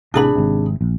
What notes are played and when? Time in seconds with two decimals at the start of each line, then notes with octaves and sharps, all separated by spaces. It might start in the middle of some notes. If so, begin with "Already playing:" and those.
0.14 A1 C3 E3 D4 G#4 B5
0.35 G#1 C3
0.81 A#1